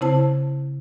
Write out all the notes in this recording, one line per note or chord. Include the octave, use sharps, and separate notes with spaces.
C#3 C4 E4 C5 A5